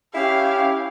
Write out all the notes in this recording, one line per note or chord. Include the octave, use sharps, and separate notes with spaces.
C#4 E4 G4 F5